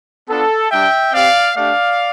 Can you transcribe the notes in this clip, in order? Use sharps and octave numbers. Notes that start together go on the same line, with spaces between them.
B3 D4 F4 A4
G3 D4 G4 E5 G5
C4 G4 D5 F5
A3 D4 G4 D5 F5